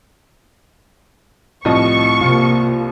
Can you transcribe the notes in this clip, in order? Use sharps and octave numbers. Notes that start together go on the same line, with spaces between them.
C2 A2 F3 D#5 C#6
C3 A#3 F4